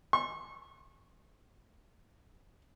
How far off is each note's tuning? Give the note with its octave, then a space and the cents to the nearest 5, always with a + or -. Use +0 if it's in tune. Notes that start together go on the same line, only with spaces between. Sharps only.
C#6 -35